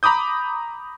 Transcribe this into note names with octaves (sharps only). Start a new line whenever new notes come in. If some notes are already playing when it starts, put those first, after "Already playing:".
A#5 B5 D6 D#6 G6